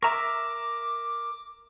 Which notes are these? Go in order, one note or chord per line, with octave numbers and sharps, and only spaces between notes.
A#4 E5 A#5 C#6 D6